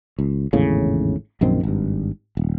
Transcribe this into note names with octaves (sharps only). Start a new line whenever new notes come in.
C#2
G#1 E2 A2 C#3
A#1 F#2 D#3 C4
G#1 G2
D#1